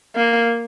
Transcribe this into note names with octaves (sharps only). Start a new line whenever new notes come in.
A#3